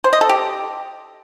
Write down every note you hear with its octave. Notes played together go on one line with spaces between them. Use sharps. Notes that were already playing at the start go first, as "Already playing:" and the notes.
C5
D#5
A4
G4